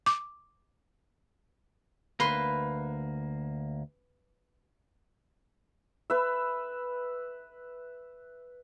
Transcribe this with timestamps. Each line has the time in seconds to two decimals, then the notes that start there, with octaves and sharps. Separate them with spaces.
0.06 D6
2.20 D2 A#3 B4 C6
6.10 B4 E5